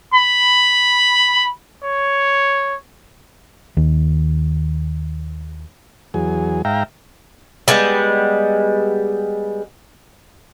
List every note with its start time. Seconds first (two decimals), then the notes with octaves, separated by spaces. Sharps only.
0.14 B5
1.84 C#5
3.77 D#2 D#3
6.14 E2 F#3 G#4
6.65 G#2 E5 F5 G5 A#5
7.68 G3 G#3 B3